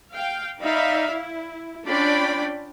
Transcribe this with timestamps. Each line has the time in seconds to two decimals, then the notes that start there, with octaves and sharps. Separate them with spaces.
0.14 F5 G5
0.60 D#4 D5 E5 F5 B5
1.13 E4
1.87 C#4 D4 F4 D5 G5 B5